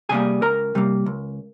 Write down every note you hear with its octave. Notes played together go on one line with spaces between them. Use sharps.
C3 G3 A#3 G#4 G#5
C#2 A#4 A#5
C3 G3 A#3
C#2